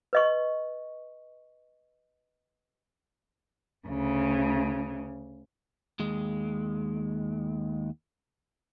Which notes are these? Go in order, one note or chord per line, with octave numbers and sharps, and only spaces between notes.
B4 D#5 C#6
D2 C#3
D#2 G#3